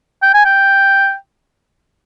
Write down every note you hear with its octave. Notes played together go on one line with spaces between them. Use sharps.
G5
G#5
G5